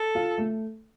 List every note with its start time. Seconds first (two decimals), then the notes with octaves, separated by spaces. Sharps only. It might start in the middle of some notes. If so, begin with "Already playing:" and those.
Already playing: A4
0.15 F4
0.38 A3